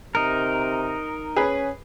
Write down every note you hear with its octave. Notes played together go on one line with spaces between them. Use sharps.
C3 D#4 A#4
C#4 G#4 B4